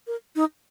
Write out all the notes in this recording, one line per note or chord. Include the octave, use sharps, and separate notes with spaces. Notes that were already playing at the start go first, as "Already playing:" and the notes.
A#4
D#4